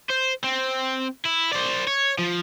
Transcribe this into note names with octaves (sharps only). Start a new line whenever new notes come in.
C5
C4
E4
C5 D5
C#5
F3